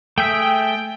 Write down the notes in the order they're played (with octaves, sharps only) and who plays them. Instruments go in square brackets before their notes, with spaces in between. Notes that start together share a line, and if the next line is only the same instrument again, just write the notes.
[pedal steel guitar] A3 G#4 E5 [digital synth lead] G5